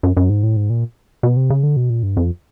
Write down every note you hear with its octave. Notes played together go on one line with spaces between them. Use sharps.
F#2
F#2
G#2
A2
G#2
A#2
B2
C3
C#3
D3
B2
A#2
G2
F2